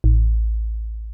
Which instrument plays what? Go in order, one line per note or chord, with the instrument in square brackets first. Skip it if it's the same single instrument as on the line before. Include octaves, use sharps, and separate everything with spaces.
[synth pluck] A1